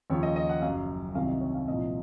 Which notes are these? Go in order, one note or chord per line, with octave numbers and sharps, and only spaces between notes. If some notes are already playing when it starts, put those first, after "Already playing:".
D#2 C#3 F3 C#5
D#5
D#5
F#5
F#1 F#2 C#3 F#3 F5
C2 C3 D#3 F#3 F5
D#5
C#5
F5
C2 A#2 F3 D#5